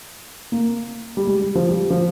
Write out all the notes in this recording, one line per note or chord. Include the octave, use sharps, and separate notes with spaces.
A#3
G3
G#3
G3
F3
G3
F3